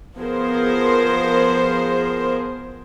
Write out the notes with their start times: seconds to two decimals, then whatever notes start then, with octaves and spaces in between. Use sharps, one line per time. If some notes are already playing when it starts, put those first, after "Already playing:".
0.17 F3 B3 G#4 A#4 C5